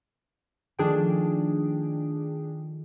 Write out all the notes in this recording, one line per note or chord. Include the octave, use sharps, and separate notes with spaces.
D#3 F3 A3 D4 G#4 G5